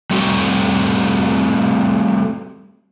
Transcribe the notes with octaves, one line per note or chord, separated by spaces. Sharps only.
G3 A3 C4 F#4